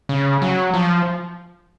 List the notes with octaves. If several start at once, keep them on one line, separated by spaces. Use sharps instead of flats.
C#3
F#3
F3